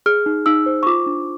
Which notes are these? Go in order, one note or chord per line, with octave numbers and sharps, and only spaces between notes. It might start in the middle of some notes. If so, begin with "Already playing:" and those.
G#4 F6
D#4
D#4 E6
C5
C#6
F4 D6
D4